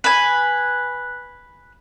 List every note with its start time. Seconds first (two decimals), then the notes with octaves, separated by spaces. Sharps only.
0.04 B4 G#5